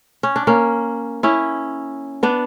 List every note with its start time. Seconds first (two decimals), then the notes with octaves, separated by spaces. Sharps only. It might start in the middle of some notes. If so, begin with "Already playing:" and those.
0.23 C#4
0.36 D4
0.47 A#3 C#4
1.23 C#4 E4
2.23 B3 D4